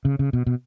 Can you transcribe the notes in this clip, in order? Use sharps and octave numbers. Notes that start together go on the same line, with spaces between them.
C#3
C#3
B2
B2